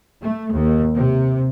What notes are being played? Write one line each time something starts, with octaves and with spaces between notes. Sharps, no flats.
A3
D#2
C3